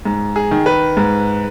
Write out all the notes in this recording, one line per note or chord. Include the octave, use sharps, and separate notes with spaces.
G#2
G#4
D#3
B4
G#2